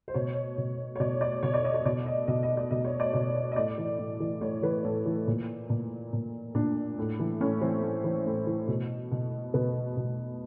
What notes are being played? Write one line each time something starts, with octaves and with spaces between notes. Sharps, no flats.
C5
B2 C#5
B2
C#5
B2 D5
D5
B2 C#5
D5
D#5
D5
B2 D5
D#5
B2 D#5
D#5
D5
B2 D#5
C#5
D5
B2 C#5
D#5
A2 D5
E3
A2
E3
A2 C#5
E3 B4
A2 A4
E3
A#2
A#2
A#2
A#2 D4
A2
E3
A2 C#4
E3 C4
A2
E3
A2
E3
B2
B2
B2 B3
B2